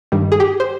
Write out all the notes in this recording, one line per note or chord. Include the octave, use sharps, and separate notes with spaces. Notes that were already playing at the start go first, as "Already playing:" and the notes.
G2 D#3 G3
G#4
G4
C5